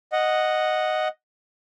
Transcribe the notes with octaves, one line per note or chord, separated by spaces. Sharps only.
D#5 F#5